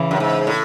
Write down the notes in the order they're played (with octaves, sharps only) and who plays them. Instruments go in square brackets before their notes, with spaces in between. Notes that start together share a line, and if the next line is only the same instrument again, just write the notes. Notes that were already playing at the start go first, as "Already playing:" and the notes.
Already playing: [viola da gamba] C#3 E3
[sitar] F#2
G#2
A2